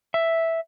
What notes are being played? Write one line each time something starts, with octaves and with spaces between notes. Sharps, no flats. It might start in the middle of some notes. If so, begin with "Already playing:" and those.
E5